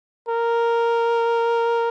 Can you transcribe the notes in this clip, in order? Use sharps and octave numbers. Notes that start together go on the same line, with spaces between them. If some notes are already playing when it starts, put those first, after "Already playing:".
A#4